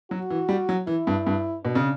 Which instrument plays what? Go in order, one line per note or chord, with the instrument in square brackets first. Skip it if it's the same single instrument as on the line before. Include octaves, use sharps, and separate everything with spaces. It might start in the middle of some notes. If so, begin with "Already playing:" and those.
[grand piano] F#3 [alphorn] F#4
[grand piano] E3
G3
F#3
[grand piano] E3 [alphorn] E4
[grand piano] G2
G2
[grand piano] B2 [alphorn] D4
[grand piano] C#3